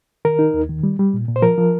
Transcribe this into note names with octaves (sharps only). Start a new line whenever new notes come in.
D#3 A#4
D#4
D#2
D#3
G3
G3
A#2
A#2
C5
F3 A#4
F3